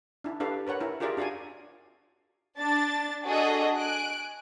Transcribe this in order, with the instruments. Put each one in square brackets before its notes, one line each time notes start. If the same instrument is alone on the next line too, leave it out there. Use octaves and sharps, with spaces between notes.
[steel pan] D4 E4
D4 G4 A4 B4 F5
A#4 B4 C#5 F#5
E4 A#4
F4 G4 G#4 A#4 D5 E5
D4 F#4 D5 F5 G#5
[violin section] D4 A5 A6
D4 F#4 G#4 A4 D#5
G#5 F#6 D7